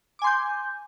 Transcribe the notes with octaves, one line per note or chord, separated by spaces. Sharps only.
G#5 C6 D6 G6